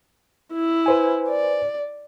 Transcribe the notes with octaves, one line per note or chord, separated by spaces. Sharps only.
E4
B4 C5 G#5
D5